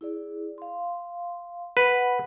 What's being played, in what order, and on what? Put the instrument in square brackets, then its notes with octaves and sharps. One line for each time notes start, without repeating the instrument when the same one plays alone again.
[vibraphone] E4 G#4 D5
F5 C6
[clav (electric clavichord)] B4 [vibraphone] F#5 B5